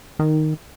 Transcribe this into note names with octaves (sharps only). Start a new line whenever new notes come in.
D#3